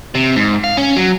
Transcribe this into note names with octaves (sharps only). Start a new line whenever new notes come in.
C3
G#2
F5
C#4
F#3